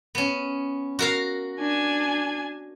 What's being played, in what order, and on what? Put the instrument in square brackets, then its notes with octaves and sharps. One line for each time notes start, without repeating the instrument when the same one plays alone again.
[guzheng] B3 C#4
F#4 A#4 F5
[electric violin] D4 G#5